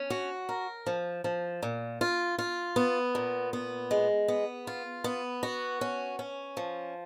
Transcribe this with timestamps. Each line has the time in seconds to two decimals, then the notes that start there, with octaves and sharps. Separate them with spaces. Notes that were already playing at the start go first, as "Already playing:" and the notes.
Already playing: C#4
0.10 F#4
0.49 A#4
0.86 F3
1.24 F3
1.63 A#2
2.01 F4
2.38 F4
2.76 B3
3.15 A#2
3.53 B3
3.91 G#3
4.28 B3
4.67 F4
5.04 B3
5.43 F#4
5.81 C#4
6.19 C#4
6.57 F3